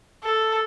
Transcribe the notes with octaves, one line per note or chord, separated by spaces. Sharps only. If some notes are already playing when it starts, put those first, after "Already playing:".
A4